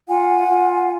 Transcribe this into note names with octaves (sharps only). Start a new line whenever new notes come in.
F4 F#5 G#5
F4